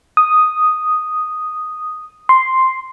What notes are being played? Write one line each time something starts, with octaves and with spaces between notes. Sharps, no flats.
D#6
C6